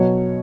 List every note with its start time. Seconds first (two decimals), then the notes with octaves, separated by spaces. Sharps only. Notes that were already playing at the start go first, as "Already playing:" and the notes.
Already playing: B2 F#3 C#5